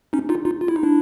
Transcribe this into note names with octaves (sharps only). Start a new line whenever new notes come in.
C#4 D#4
D#4 F4
D#4 F4
F4
E4
D#4
D4 E4